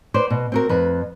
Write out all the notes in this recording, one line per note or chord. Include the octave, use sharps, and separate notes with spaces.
B4 C5 D5
B2
C4 F#4 A#4
F2 B4